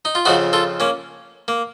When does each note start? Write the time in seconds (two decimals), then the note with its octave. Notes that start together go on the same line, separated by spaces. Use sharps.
0.05 D#4
0.15 F4
0.25 F2 C#3 F3 D#4 F#4
0.53 F4 A4
0.80 A#3 C#4
1.48 A#3